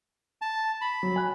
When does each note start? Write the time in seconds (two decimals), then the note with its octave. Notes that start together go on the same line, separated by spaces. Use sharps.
0.42 A5
0.81 B5
1.03 F#3
1.16 G#5 F#6